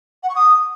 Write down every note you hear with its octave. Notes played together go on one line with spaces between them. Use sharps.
F#5
C#6
D#6